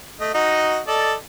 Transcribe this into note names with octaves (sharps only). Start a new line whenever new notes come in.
A3 D#5
D#4 F#4 D#5
A4 D5 D#5